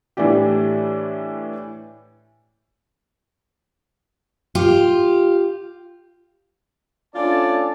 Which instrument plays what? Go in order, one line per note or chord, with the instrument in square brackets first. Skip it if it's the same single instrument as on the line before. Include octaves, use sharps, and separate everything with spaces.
[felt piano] A2 E3 A3 D4 G4
[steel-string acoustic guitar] F4 G4
[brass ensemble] A3 G#5 A5 [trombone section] C#4 D4 A4 [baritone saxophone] F4 [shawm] D5